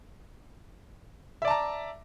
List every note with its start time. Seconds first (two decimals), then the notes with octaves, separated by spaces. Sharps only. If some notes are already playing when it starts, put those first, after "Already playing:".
1.42 E5
1.45 D5
1.48 A5
1.50 A#5